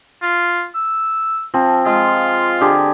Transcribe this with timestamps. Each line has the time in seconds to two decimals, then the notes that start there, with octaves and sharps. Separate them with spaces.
0.22 F4
0.75 E6
1.54 F3 C4
1.86 G#3 F4
2.61 D3 G4 G#4